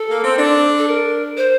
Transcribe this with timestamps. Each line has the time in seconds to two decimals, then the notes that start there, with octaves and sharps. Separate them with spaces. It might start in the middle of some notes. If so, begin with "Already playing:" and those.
Already playing: A4
0.10 A#3
0.24 C4
0.38 D4
0.78 A4
0.87 A#4
1.37 C5